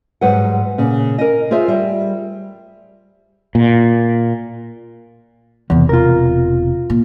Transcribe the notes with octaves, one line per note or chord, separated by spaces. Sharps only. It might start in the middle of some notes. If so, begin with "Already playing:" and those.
G#2 F#3 G3 B4 F#5
A#2 C#3
A#4 D#5
F4 G#4 C5 E5
G3
A#2
E1 E2 C3
F4 A#4
A#2